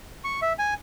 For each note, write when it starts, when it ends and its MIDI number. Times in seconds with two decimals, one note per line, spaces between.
0.24 0.40 85
0.42 0.53 76
0.59 0.74 80